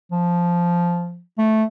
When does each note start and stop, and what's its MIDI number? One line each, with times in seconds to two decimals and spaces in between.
0.12 1.20 53
1.38 1.63 57